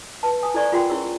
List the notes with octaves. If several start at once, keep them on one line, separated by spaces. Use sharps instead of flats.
B4 A5
G#5 D#6
E4 A4 C5 D5 G#5 C#6
F4 G#4 A#4 F#5 G5 C6
C#4 E4 G#4 C#5 C#6 E6